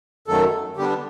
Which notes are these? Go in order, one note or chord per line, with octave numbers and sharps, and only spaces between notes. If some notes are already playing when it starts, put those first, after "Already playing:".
F#2 D#3 F#3 A3 A4
D3 G3 B3 D4 G4